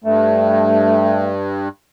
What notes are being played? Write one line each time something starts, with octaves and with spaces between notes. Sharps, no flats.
G2 A3